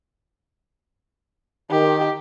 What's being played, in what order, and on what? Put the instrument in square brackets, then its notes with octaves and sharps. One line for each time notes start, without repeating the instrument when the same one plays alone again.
[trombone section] D#3 [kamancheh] G4